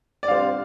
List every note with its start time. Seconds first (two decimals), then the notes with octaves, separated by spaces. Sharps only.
0.23 D5
0.28 D3 G3 C4 F4 F5